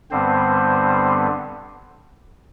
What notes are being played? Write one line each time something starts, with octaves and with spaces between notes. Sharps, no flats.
G2 D3 G3 B3 C4 C5